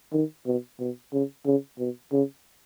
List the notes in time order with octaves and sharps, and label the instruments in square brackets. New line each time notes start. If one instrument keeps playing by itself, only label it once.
[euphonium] D#3
B2
B2
C#3
C#3
B2
C#3